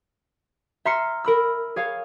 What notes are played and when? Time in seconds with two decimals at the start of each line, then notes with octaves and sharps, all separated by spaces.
0.85 E5 A#5 C6 F6 C7 C#7
1.24 A#4 B5 E6
1.76 G#4 C#5 F5